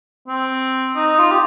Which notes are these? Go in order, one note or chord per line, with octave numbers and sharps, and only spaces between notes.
C4
D#4
F4
G4